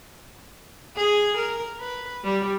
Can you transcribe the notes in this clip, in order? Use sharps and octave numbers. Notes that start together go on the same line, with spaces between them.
G#4
A#4
B4
G3